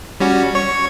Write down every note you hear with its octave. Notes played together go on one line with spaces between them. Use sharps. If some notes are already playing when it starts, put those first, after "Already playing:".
G3 C#4 F#4
C#5 C#6